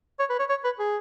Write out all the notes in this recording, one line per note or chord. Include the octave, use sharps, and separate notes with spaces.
C#5
B4
C#5
C#5
B4
G#4